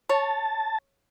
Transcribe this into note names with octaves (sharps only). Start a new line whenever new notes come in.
C#5 A5